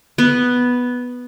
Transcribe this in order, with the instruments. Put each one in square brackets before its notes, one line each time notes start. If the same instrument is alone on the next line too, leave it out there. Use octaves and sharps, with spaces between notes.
[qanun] B3